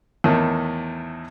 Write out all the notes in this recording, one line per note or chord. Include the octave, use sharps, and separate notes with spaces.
E2 A2 D#3